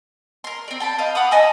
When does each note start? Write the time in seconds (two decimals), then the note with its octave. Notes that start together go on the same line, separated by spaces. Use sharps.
0.44 A#4 C6
0.68 C4 D5
0.80 G5 A5 B5
0.98 C5 D#5 F5
1.15 F#5 B5 D6 D#6
1.31 D#5 G#5 A5 E6